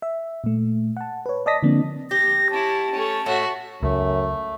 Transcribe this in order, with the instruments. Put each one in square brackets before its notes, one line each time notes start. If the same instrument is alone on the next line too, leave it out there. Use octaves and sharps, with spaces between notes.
[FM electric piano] E5
A#2 A3
F#5 A5
B4 C#5
D5 D#5 A5 D#6 A#6 B6
D3 F3 A#3 C4 D4
[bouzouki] G4 [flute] A#6
[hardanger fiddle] C#4 E4 [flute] A5
[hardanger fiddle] A3 C#4
[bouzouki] A2 [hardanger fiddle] F#4 E5
[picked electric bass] C#2 [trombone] F#2 [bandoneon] A3